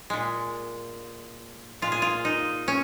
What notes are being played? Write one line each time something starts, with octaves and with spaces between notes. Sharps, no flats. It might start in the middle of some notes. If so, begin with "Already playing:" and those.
A#2 G#3
A#2 G#3 F4
G#4
F4
D#4
C#4